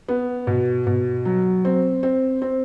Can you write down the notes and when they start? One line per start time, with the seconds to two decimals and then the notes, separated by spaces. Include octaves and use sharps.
0.08 B3
0.47 B2
0.87 B2
1.25 F#3
1.65 C4
2.03 C4
2.42 C4